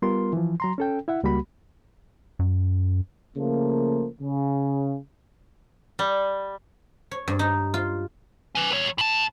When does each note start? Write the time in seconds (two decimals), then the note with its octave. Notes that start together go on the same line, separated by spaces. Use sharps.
0.02 G3 B3 F4 A#4 C6
0.33 E3 F3
0.60 F#3 A#5 C6
0.78 C#4 A4 G5
1.08 E4 E5 F#5
1.23 C#2 G3 A#3 F#4 B5
2.39 F#2
3.36 C#3 F3 A3 A#3
4.20 C#3
5.99 G3
7.11 C#5
7.28 G2
7.39 D#4
7.74 F4
8.55 C#4 B4
8.72 E2 C#5
8.98 A2 A5